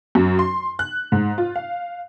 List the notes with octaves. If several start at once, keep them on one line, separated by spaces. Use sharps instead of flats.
F#2
C6
F#6
G#2
F4
F5